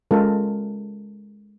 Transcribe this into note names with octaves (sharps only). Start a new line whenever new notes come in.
G#3 C#4 F4 A4 A#4